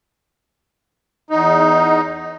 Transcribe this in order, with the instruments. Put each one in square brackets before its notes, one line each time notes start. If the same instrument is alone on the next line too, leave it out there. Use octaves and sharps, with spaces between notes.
[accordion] E2 D#4